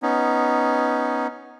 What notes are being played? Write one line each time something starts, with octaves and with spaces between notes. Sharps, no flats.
B3 C#4 D#4